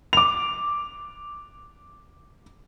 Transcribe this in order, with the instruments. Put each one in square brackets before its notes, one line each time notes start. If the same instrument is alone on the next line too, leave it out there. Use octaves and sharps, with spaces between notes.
[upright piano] D6 F7